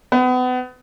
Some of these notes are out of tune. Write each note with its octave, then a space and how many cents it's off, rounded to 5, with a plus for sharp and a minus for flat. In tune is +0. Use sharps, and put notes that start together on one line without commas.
B3 +35